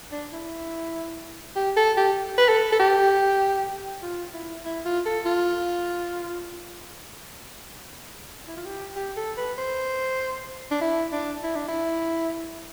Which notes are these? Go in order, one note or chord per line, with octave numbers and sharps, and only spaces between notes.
D4
E4
G4
A4
G4
B4
A4
A4
G4
F4
E4
E4
F4
A4
F4
E4
F4
G4
G4
A4
B4
C5
D4
E4
D4
E4
D4
E4